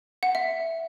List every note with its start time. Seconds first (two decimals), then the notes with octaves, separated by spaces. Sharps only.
0.23 F#5
0.35 E5